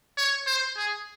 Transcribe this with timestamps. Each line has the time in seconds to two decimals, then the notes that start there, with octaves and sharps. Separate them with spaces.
0.17 C#5
0.47 C5
0.77 G#4